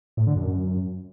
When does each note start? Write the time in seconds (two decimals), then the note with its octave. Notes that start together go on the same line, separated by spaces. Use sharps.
0.17 A2
0.27 D3
0.36 F#2